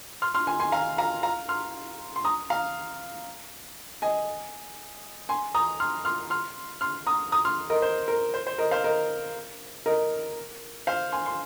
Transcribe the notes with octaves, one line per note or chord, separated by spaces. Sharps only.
C6 F6
C6 F6
G#5 C6
G#5 C6
F5 A#5
F5 A#5
F5 A#5
C6 F6
C6
A#5 D#6
F5 A#5
D#5 G#5
G#5 C6
A#5 D#6
C6 F6
C6 F6
C6 F6
C6 F6
A#5 D#6
A#5 D#6
C6 F6
A#4 D#5
C5
A#4
C5
C5
A#4 D#5
C5 F5
A#4 D#5
A#4 D#5
C5 F5
G#5 C6
C6